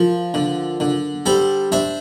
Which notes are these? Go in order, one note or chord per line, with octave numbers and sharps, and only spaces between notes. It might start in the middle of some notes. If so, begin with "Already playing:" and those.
Already playing: F3 A#4
D3
D3
G3 A4 C5
D4 C5 E5